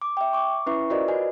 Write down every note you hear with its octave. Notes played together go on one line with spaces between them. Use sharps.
D6
E5 G5
C#6 D6
C#4 E4 B4 E5 C#6
F4 F#4 A#4 C5 D5 D#5
F#4 B4 D#5 G#5